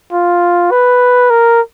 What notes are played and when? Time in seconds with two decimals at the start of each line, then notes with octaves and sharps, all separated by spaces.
0.12 F4
0.71 B4
1.30 A#4